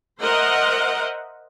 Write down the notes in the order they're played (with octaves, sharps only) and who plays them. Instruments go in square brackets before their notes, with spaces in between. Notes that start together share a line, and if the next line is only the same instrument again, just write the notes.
[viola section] A#4 C5 D#5 E5 F#5